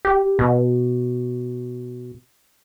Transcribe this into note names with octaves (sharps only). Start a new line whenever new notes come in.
G4
B2